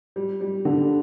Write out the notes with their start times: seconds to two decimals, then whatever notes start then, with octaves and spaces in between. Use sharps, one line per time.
0.16 G3
0.41 G3
0.65 D3